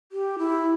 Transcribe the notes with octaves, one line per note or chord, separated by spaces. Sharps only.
G4
E4